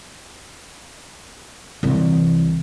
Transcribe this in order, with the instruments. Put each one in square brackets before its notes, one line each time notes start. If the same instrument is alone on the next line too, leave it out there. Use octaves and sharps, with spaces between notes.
[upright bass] C2 E3